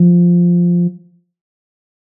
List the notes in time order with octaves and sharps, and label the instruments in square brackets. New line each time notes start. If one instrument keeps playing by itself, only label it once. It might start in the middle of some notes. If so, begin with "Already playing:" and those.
Already playing: [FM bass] F3